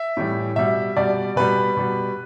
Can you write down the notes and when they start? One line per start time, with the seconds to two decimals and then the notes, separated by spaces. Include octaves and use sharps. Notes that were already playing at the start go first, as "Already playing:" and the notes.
Already playing: E5
0.17 A2 E3 G3
0.56 B2 G3 E5
0.97 B2 G3 D5
1.36 B2 G3 B4
1.77 B2 G3